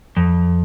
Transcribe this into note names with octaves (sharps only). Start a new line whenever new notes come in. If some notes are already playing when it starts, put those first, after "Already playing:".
F2